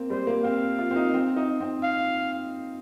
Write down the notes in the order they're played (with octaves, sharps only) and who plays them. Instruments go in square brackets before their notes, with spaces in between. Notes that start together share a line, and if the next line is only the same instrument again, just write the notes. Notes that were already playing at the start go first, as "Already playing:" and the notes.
Already playing: [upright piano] A#3 C4
[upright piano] G3 [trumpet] C5
[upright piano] A#3
[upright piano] C4 [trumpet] F5
[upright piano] F4
C4
D#4
C4
D#4
C4
[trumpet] F5